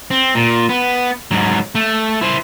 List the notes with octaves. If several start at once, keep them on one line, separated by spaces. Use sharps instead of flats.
C4
A#2
B3
G#2 F#3
A3
E4 C5